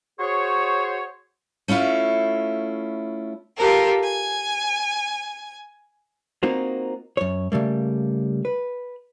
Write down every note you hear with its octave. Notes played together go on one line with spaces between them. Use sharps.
F#4 G#4 C5 C#5
A3 C#4 E4 F4
F4 G4 A4 A#4
G#5
A#3 C4 D#4 F4 F#4
F#2 C#5
C#3 G3 A3 A#3
B4